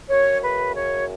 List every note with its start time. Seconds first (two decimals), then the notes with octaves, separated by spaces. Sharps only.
0.09 F#2 C#5
0.42 C#3 B4
0.75 F#2 C#5